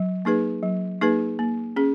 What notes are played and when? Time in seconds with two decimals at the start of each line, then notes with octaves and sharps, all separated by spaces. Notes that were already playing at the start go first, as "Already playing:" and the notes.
Already playing: F#3
0.25 A#3 D#4 G#4 B4
0.63 F#3
1.01 A#3 D#4 G#4 B4
1.39 A#3
1.76 C#4 G#4